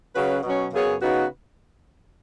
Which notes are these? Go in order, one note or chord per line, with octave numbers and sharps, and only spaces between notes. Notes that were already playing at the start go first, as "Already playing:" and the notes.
C#3 F#3 C#4 F#4 B4
B2 F#3 C#4
F#2 C#3 B3 G#4 C#5
C#3 B3 D#4 F#4 B4